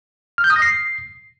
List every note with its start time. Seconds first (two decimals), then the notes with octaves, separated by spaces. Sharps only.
0.38 F6
0.44 G6
0.50 D#6
0.56 A#6
0.62 C7